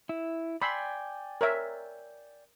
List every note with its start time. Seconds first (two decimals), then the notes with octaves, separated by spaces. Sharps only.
0.09 E4
0.62 D5 G5 G#5 B5 C6 E6
1.41 A#4 C#5 E5